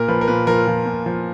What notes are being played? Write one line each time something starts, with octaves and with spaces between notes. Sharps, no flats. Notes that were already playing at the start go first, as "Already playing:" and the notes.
Already playing: A#2 A#4
F3 B4
A#4
A#2 B4
F3 A#4
F3
A#2
F3